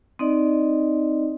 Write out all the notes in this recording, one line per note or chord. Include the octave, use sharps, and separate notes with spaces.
C4 D#4 D5 D#5